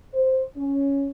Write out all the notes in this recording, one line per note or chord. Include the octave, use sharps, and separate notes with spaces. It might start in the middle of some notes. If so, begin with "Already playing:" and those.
C5
C#4